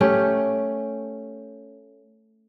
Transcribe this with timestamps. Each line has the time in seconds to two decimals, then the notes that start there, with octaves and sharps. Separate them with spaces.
0.01 A3 C#4 G4